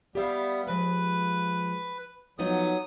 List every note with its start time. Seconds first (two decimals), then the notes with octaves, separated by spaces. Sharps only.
0.15 G3 B3 G4 E5 F5
0.67 F3 G#3 B4
2.39 F3 F#3 B3 D#4 D#6